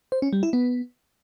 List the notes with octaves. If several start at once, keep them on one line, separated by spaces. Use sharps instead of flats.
C5
C#4
G3
E4
B3